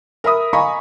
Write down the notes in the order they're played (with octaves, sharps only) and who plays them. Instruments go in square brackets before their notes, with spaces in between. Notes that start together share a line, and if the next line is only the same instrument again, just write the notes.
[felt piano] A#4 E5 B5 D#6
D#5 F5 G#5 A#5 B5 C#6